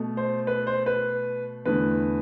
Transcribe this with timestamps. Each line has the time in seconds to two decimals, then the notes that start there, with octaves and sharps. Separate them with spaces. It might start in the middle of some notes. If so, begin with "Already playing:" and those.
Already playing: B2 A3
0.17 C5
0.47 B4
0.67 C5
0.86 B4
1.65 E2 D3 A3 B4